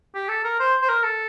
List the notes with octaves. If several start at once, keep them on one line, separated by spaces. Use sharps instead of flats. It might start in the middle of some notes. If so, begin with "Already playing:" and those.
G4
A4
A#4
C5
C5
A#4
A4